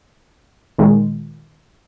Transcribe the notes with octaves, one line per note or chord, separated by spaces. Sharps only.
A#2 D#3 G#3